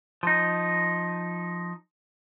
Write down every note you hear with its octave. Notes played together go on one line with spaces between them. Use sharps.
F3 D#4